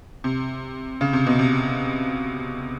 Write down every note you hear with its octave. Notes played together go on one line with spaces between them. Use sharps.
C3
C#3
C3
B2
C3